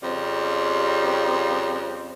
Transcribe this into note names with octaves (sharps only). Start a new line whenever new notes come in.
F2 C#3 G3